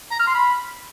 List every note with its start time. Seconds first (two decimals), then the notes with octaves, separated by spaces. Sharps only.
0.12 A#5
0.19 F6
0.27 C6
0.35 B5